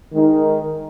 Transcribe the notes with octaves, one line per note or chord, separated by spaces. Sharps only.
D#3 G#3 D#4 A#4